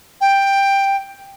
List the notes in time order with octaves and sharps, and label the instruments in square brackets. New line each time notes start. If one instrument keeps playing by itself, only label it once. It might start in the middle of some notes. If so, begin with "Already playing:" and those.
[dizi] G5